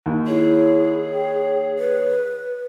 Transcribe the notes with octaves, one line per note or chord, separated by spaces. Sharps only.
D#2
E4 G#4 C#5
G5
B4